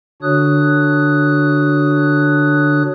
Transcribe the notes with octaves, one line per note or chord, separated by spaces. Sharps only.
D3 D4 F#4 C#5 D#6 F#6